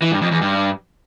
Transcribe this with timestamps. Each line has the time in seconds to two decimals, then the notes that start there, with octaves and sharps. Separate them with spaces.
0.02 E3
0.12 G2
0.22 F2
0.31 E2
0.41 G2